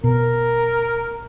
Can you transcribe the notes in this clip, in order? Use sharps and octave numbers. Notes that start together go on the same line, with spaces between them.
B2 A#4